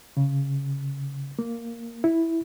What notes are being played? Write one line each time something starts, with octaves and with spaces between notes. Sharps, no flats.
C#3
A#3
E4